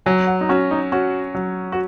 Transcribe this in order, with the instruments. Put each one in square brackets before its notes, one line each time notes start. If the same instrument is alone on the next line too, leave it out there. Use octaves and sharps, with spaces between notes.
[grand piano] F#3 [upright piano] G#5
[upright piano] F#5
D#4
[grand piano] C#4 [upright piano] F#4
[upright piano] D#4
[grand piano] C#4 [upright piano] F#4
[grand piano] F#3
[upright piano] F#4